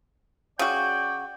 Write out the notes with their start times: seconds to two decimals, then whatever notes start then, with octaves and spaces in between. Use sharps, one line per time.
0.59 C#3 F#4 D5 G5